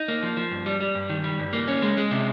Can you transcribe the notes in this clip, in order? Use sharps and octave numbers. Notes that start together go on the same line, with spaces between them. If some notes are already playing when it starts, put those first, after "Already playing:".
Already playing: D#4
A#3
F3
F3
G2
G3
G3
G2
D#3
G3
G2
A#3
C#4
G#3
G#3
C3